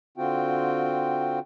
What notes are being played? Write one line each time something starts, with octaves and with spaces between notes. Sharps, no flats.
D3 C4 F4 F#4 G5